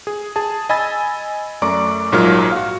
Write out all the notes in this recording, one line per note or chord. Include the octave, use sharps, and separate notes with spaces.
G#4
G#4 A5
D#5 G#5 B5 E6 A6
F#2 A3 D5 A#5 C#6 D6
A#1 G#2 F#3 F4 A#4 F6
F#4 F5